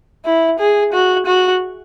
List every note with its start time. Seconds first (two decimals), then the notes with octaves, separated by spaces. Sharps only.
0.25 E4
0.59 G#4
0.93 F#4
1.26 F#4